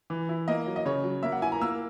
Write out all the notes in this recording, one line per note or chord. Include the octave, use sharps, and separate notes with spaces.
E3
E4
A#3 D#5
F#3
D#5
C#3 C#5
F#3
A#3 E5
F#5
E4 G#5
A#5
A#3 E6